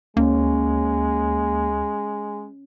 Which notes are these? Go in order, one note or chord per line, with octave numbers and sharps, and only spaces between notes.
D2 G#3 A#3 C#4